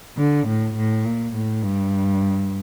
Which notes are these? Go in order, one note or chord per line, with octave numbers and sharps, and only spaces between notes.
D3
A2
A2
A#2
A2
G2